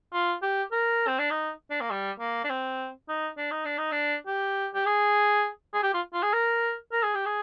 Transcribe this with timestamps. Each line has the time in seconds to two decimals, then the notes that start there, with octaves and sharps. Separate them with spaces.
0.13 F4
0.42 G4
0.72 A#4
1.07 C4
1.19 D4
1.31 D#4
1.70 D4
1.81 A#3
1.91 G3
2.19 A#3
2.44 D4
2.49 C4
3.08 D#4
3.37 D4
3.51 D#4
3.65 D4
3.78 D#4
3.92 D4
4.27 G4
4.74 G4
4.86 G#4
5.74 G#4
5.83 G4
5.94 F4
6.14 F4
6.23 G#4
6.33 A#4
6.92 A#4
7.03 G#4
7.15 G4
7.26 G#4